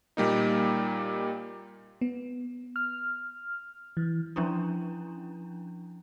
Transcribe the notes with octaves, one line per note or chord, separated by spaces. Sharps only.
A#2 G3 A#3 D#4
B3
F6
E3
F3 C#4 D4 E4